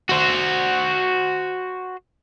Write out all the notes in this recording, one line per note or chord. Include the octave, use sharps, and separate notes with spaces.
F#4 C5